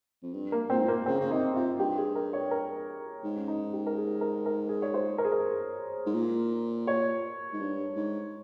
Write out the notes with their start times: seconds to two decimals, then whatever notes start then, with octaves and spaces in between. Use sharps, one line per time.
0.23 F2
0.33 G2
0.52 A#3
0.70 A#2 C4
0.78 G#2
0.86 A#2 A#3
1.06 C#3 C4
1.20 C#3
1.31 C3 D#4
1.55 C3 F4
1.79 G2 G4
1.97 G#4
2.15 A#4
2.33 C#5
2.51 A#4
3.24 G#2
3.37 C#4
3.48 D#4
3.73 G4
3.87 A#4
3.97 G#4
4.21 A#4
4.46 A#4
4.69 G#4
4.82 C#5
4.94 C5
5.18 A#4
5.24 G#4
5.32 A#4
6.06 G#2
6.14 A#2
6.87 C#5
7.53 G#2
7.60 G2
7.96 G#2